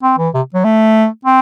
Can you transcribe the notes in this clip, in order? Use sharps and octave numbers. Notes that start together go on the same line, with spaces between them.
C4
E3
C3
F#3
A3
C4